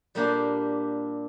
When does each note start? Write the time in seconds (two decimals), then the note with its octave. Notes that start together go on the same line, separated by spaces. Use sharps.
0.15 A#2 G3 A#3 D4 G4